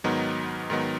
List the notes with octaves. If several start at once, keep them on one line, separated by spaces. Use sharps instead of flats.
G#2 D#3 F#3 B3 D#4
G#2 D#3 F#3 B3 D#4